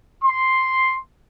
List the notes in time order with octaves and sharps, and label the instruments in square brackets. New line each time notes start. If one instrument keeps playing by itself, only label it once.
[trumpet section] C6